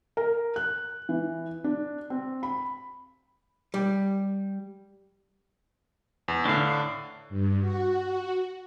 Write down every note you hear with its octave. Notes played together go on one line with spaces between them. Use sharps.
A#4
F#6
E3
D4
C4
B5
G3
E2
A2 D3 D4 F5
G2
F#4